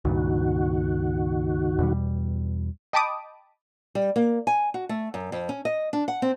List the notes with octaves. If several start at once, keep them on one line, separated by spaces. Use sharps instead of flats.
C#2 G2 A#2 D#3 F#4
E2 B2 G3
D#5 G5 A5 B5 D6 D#6
G3
A#3
G#5
F#4
A3
F#2
F2
C#4
D#5
D4
F#5
C4